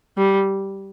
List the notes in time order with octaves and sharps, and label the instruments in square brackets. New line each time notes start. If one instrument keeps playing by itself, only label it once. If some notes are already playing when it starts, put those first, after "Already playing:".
[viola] G3